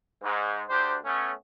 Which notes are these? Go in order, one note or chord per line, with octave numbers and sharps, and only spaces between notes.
G#2
D2 D4 G4 C5
A3 B3 C#4